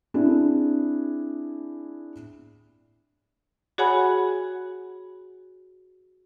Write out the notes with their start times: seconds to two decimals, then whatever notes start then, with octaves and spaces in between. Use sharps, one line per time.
0.14 C4 D4 E4 G#4
3.78 F#4 G#4 C#5 F#5 G#5 B5